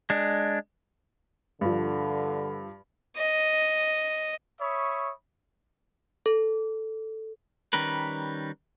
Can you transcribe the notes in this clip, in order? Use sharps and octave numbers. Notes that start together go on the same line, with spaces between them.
G#3 D4
G2 D3 F3
D#5
C#5 E5 B5 C#6 D#6
A4
D#3 G3 C#4 A#4 B4